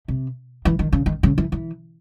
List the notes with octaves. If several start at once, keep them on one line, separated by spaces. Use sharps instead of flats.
C3
E3
D#3
C#3
D#3
C#3
E3
E3